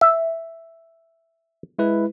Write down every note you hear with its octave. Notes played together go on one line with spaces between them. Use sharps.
E5
G#3 E4 B4